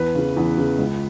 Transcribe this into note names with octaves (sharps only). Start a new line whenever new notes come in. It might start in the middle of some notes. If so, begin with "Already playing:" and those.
Already playing: E2 B4
C#3 E3
E2
C#3 E3
C#2